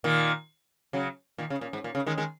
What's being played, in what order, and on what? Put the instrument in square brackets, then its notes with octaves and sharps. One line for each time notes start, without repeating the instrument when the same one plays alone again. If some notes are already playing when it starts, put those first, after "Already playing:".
[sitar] A#2 D#3
C#3 F#3
A#2 D#3
C#3
A#2
G#2
A#2
C#3
D#3 G#3
D#3 G#3